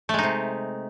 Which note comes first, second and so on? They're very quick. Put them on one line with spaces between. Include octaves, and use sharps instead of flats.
A3 G#3 D#4 C3